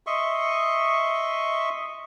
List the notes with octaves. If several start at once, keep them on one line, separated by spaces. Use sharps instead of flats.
D#5 E5 C6 C#6